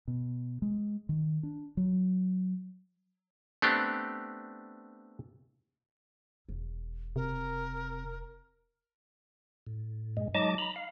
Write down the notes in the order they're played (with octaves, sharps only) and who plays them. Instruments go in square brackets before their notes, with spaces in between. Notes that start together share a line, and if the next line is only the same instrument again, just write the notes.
[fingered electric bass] B2
G#3
D#3
D4
F#3
[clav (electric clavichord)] A3 B3 C4 D4 G4
[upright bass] E1
[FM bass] C3 [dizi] A#4
[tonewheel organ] A2
G2 A#2 G#3
F#3 G#3 D#4 D#5 A5 D6
A#5 B5
F5